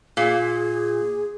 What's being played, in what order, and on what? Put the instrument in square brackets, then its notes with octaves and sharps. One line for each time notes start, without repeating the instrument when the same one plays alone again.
[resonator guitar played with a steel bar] A#2 [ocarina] G#4